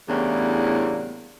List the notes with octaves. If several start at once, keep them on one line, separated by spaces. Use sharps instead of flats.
E2 A2 C#3 G3 A#3 D4